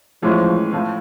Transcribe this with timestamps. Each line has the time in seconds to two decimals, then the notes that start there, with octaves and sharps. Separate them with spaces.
0.23 A2 E3 F3 G#3 C#4
0.73 A2 F3 A3